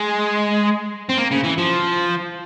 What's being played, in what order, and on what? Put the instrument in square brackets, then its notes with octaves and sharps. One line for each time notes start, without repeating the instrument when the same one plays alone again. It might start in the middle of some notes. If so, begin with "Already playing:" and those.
Already playing: [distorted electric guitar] G#3
C4
A#3
C#3
E3
F3